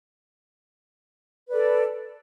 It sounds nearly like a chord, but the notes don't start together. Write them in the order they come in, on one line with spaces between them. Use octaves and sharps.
B4 D5 A4